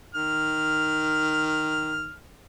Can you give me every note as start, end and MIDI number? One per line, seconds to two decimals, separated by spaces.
0.14 2.12 51
0.14 2.12 89